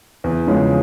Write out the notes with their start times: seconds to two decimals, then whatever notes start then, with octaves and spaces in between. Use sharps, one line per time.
0.24 E2
0.47 C#3 F3 G#3 C#4